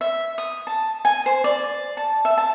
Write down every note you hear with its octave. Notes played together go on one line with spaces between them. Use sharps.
E5
D#6
A5
G#5
C5
D5
A5
E5
A5